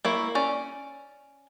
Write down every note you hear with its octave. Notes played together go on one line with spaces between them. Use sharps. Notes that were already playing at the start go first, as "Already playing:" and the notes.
A#3 E4 C#5
C#4 D5